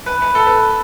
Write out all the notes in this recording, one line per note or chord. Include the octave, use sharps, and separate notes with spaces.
B4
B4
A4
B4